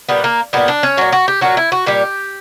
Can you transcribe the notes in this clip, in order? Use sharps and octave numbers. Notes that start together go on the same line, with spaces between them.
A#2 G3 B3
A#3
A#2 G3 B3
D4
C#4
A#2 F#3 F#4
F#4
G4
A#2 F#3 F#4
E4
F#4
A#2 G3 G4